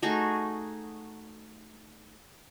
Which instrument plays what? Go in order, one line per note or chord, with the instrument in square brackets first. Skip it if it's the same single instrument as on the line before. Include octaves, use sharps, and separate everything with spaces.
[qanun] A3 D#4 F#4 G#4